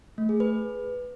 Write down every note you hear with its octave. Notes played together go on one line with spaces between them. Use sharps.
A3
G#4
B4